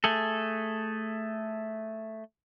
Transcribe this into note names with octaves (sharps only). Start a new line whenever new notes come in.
A3 G#4 A4